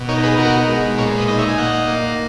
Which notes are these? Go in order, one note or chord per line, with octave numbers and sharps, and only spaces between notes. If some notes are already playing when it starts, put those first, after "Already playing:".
Already playing: B2
D#4 A#4 C#5
G#4 B4
B2 F#4 A#4
G#3
A#2 A#4 C#5
B4 D#5
D#4 D#5
C#5 E5
G#5
A#2 D#5 F#5
A#3